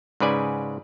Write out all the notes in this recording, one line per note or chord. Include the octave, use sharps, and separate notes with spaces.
G#2 C#3 B4 D5 G#5